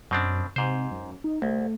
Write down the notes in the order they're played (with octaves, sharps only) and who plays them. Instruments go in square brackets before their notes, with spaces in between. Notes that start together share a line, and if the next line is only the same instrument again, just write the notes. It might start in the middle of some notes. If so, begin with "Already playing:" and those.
[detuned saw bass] F#2 [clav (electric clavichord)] B2 C4 D4
[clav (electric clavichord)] G#2 C5 [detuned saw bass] C3
[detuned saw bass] F#2
D#4
[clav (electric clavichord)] C2 [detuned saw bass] A3